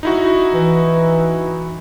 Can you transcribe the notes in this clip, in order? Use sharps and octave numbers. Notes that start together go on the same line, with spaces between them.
D#4 E4 F#4
E3